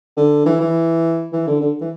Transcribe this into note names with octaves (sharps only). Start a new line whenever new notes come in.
D3
E3
E3
E3
D3
D3
E3